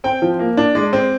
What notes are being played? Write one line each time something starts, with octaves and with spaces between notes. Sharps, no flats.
C4 G5
F3
A#3
D4
G#3 D5
C4